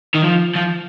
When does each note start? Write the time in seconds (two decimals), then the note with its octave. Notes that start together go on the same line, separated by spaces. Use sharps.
0.15 D#3
0.24 F3
0.55 F3